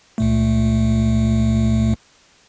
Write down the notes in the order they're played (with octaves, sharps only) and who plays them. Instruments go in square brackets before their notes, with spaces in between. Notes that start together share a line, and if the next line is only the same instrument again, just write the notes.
[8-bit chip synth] C#2 A#2 A3